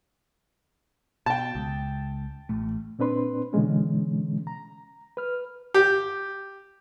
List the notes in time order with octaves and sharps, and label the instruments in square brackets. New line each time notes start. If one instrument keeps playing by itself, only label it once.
[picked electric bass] B2 [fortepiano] G5 A5
[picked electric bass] C#2
A1 A2 A3
[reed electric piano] A#2 C4 D4 B4 C6
B2 D3 E3 G#3 C#4
A#5
B4 F6
[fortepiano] G4